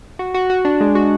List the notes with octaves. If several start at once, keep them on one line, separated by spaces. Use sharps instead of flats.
F#4
F#4
F#4
D4
G#3
F#4